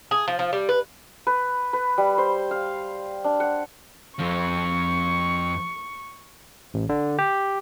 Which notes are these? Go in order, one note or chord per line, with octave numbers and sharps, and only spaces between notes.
G#4
F3
F3
G3
B4
B4
B4
G3
C5
F5
D4
F#5
F2 F3 C#6
A1
D3
G4